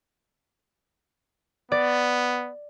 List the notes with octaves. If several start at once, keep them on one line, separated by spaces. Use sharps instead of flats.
B3 D5